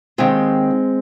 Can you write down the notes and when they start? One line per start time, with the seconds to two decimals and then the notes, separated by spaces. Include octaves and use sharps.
0.18 D#2 D#3 G#3 C4